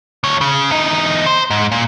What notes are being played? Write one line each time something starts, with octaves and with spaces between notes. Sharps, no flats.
D2 C#5
C#3
E2 D#4
C5
G#2
A#2